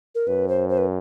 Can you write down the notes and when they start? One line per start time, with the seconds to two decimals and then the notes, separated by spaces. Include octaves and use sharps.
0.15 A#4
0.27 F#2 B4
0.48 C5
0.69 C5
0.78 B4